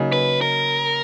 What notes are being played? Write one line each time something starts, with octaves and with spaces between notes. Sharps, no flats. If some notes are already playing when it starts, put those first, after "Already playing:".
Already playing: C#3 F#3 A#3 D#4
B4
A#4